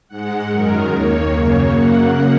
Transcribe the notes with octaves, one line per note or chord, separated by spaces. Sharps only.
G#2 G#3 F#5
F#2 D#3 G#3 A#4
D#2 D#3 A#3 C#5
F#2 C#3 A#3 C#5
F#2 C#3 A#3 F#5